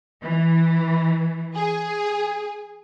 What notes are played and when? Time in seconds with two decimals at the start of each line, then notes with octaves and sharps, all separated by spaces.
0.23 E3
1.55 G#4